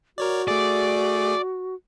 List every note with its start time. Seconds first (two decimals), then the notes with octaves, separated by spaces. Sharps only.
0.18 F#4 A#4 C#5 D5
0.48 A3 G#4 D5